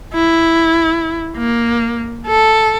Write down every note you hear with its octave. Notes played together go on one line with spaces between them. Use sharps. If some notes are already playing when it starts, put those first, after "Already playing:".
E4
A#3
A4